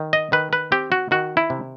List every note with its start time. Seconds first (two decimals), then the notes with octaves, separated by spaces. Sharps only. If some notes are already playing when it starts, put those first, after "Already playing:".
Already playing: D#3
0.13 D#5
0.32 D#3 B4
0.53 B4
0.72 C4 G4
0.92 F#4
1.11 D#3 F#4
1.37 E4
1.50 C3